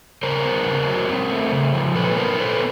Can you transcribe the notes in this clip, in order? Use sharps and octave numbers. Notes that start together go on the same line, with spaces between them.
C#3 A#4 C5
B3
C#3
F#3
C4
A3
C#3
F3
A#2 A4 B4
B3 A#4 C5
A#2 A4 B4